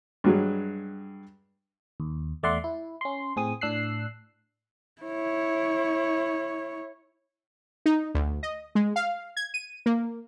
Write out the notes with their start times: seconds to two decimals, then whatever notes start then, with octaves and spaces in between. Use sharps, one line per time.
0.24 G2 F#3 G#3
2.00 D#2
2.43 E2 A3 D5 E5 F#5 C6
2.64 E4
3.01 C#4 C6
3.36 A2 C4 G#4 D#6
3.61 A2 D4 E6 F#6 C7
5.02 E4 C#5
7.86 D#4
8.15 D2
8.43 D#5
8.75 G#3
8.96 F5
9.37 G#6
9.54 D#7
9.86 A#3